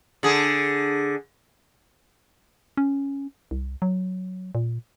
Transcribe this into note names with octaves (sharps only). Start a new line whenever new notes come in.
D3 G#4
C#4
C2
F#3
A#2